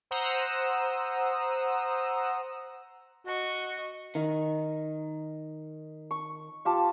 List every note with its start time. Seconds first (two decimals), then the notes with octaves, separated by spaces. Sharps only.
0.11 C5 F#5 A#5 D#6 E6
3.26 F#4 D#5 C#6
4.15 D#3
6.11 C#6
6.65 F4 G4 A5